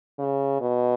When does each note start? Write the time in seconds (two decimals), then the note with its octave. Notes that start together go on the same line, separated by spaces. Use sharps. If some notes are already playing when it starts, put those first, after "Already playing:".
0.19 C#3
0.61 B2